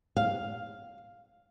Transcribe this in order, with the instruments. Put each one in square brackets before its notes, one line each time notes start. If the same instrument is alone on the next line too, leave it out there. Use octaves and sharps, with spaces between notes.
[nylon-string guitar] F5